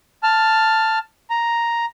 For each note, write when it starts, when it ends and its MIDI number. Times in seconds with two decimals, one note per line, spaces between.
0.23 0.99 81
0.23 0.99 89
1.30 1.85 82